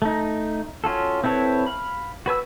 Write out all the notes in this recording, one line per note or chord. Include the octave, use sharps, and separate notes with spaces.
A3 D#4
C#4 F4 F#4 A4
C4 E4 A4 B4 C#5
F5 B5
F#4 B4 G#5 E6